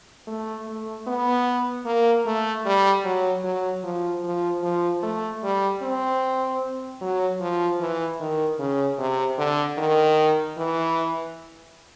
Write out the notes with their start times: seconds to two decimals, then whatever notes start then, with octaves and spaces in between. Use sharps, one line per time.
0.27 A3
0.67 A3
1.07 B3
1.86 A#3
2.26 A3
2.66 G3
3.05 F#3
3.44 F#3
3.84 F3
4.24 F3
4.63 F3
5.03 A3
5.43 G3
5.82 C4
7.01 F#3
7.41 F3
7.80 E3
8.20 D#3
8.59 C#3
8.99 C3
9.38 D3
9.78 D#3
10.58 E3